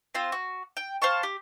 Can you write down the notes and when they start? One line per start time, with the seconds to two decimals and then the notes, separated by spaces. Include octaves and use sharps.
0.15 C4 F4 C5
0.32 F#4
0.77 G5
1.02 C5 F5 A5 C#6
1.23 G4